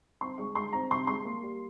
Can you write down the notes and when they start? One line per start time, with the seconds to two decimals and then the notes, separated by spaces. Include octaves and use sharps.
0.21 C4 C6
0.38 G#3 C#6
0.55 G#3 C6
0.73 C4 A#5
0.90 C3 C6
1.07 G#3 C6
1.25 A#3
1.43 G3